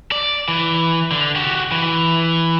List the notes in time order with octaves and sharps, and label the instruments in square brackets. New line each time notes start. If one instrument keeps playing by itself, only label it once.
[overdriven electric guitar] D5
E3
D3
F#4 G4
E3